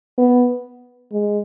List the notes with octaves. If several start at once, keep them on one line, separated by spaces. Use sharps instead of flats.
B3
G#3